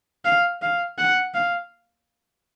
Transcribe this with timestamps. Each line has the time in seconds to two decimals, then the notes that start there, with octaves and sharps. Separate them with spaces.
0.25 F5
0.62 F5
0.98 F#5
1.34 F5